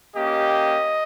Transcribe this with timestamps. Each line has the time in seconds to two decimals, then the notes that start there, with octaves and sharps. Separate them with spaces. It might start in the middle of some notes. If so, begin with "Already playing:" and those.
0.14 A#3 C#4 G4 D#5